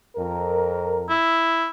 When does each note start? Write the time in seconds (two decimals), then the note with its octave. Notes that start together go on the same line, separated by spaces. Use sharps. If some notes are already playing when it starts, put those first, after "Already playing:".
0.15 F2 A#4
1.09 E4